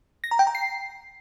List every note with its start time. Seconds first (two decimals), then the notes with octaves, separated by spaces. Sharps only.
0.24 A#6
0.31 A#5
0.39 G5
0.47 A#5
0.55 C7